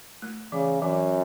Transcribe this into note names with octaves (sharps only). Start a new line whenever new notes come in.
A3
C#3 E3
F#2 E3